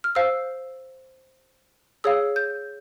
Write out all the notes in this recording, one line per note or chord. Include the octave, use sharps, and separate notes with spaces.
F6
C5 F5 E6
G#4 C#5 F5 E6
G6